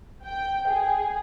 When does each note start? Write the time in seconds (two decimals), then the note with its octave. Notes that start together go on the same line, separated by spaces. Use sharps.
0.24 G5
0.67 G#4